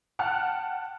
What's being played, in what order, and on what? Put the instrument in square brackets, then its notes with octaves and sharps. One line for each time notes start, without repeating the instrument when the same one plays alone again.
[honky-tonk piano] F#5 G5 A5 F6 F#6